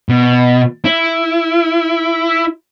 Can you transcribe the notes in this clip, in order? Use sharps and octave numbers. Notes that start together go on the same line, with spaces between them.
B2
E4